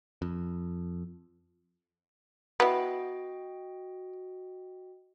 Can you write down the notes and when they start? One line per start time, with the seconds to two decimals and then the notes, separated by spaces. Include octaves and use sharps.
0.22 F2
2.60 B3 E4 F#4 D#5 G5